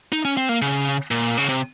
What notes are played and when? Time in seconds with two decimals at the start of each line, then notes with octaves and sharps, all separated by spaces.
0.12 D#4
0.25 C#4
0.37 C4
0.49 A#3
0.62 C#3
1.11 A#2
1.38 C#3
1.49 C3